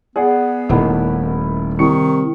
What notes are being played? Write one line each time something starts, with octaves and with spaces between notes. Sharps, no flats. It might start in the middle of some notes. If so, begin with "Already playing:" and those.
B3 G#4 D5 F#5
D#1 D#3 A3 E4
C2 D#3 C#6 C#7